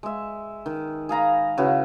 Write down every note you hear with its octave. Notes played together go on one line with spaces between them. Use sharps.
G#3 E5
D#3
G#4 F5 A#5 B5
C#3 E4 F#4 B4